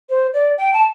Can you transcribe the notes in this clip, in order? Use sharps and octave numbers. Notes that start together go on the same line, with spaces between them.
C5
D5
G5
A5